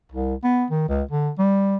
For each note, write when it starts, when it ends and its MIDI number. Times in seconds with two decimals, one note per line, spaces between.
0.12 0.34 36
0.44 0.65 59
0.70 0.87 51
0.89 1.02 37
1.11 1.30 50
1.38 1.77 55